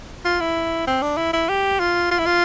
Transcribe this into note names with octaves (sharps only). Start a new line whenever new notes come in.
F4
E4
C4
D4
E4
E4
G4
F4
F4
E4
F4